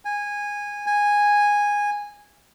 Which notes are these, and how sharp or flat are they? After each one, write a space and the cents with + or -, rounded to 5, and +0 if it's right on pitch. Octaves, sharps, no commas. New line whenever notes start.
G#5 -15
G#5 -10